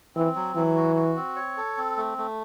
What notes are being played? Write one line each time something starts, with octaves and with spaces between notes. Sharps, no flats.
E3 C4
F#3
E3 F#3
F#4
F#4
C4
C#5
A4
C4
A3
A3